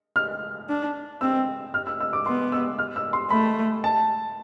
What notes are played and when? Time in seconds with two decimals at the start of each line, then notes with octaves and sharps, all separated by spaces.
0.16 F6
0.69 D4
1.21 C4 E6
1.74 F6
1.87 E6
2.01 E6
2.13 D6
2.26 B3 C6
2.52 E6
2.79 F6
2.96 E6
3.13 C6
3.31 A3 B5
3.84 A5